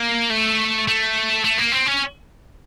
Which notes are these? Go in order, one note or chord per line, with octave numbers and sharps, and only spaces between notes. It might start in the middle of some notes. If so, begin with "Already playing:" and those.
Already playing: A#3
A3
A3
A3
A#3
C4
C#4